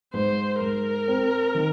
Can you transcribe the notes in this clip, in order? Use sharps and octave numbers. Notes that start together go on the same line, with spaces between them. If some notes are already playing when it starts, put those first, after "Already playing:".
G#2 C5
G#2 A#4
C4
D#3